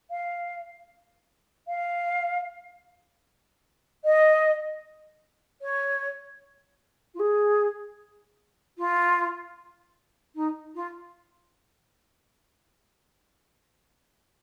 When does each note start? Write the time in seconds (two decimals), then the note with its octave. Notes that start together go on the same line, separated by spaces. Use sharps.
0.10 F5
1.67 F5
4.04 D#5
5.61 C#5
7.14 F4
7.19 G#4
8.78 F4
10.35 D#4
10.75 F4